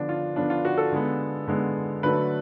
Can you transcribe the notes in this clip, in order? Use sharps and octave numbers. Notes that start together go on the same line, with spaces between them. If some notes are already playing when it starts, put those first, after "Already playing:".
Already playing: D3 F3 B3 D4
F4
D3 F3 B3 D4
F4
F#4
A4
D3 G#3 B3
D3 G#3 B3
D3 F#3 A3 B4